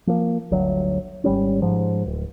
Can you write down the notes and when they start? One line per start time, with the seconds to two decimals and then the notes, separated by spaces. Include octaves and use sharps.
0.07 F3 A#3
0.51 G1 D2 G2 F#3
1.24 G#1 G3 C#4
1.62 G#2 F3
2.06 D1